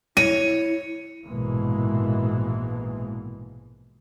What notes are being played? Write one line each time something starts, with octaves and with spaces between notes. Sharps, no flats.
E4 C#5 D#7
A#1 G#2 B2 E3 G#3 A#3